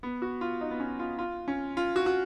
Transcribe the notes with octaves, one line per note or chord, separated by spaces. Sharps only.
B3
F#4
F4
D#4
B3
C#4
F4
F4
C#4
F4
F#4
F#4